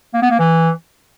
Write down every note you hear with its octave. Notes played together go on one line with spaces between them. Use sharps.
A#3
B3
A#3
E3